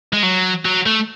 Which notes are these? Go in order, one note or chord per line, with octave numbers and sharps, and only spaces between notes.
G#3
F#3
F#3
A3